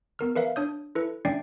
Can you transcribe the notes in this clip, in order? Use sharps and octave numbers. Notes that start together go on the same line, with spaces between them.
B3 A#4 F6
A#4 B4 E5 F5
D4 C#5 D#6 G6
E4 A4 B4
A3 C#4 D4 D5 G5 C7